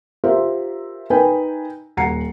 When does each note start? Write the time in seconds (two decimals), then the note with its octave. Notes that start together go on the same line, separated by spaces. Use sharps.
0.24 F4 G4 A#4 C5 E5
1.10 D#4 A#4 B4 G5 G#5
1.97 D#1 F#5 A#5 C7 C#7